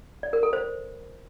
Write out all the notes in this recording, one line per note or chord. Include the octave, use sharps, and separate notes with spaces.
D5
A#4
A4
C5